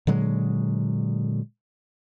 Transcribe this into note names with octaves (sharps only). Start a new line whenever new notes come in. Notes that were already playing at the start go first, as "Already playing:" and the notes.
A#2 D3 F#3 G#3